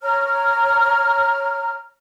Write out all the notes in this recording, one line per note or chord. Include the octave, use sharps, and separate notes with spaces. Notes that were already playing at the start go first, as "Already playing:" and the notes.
C#5 A#5 F6